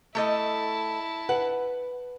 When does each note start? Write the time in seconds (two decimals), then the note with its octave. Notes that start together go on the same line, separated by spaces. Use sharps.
0.15 A3 E4 A4 D#5 A5
1.29 B4 F#5